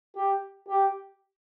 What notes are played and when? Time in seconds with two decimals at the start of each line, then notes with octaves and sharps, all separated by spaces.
0.16 G4
0.68 G4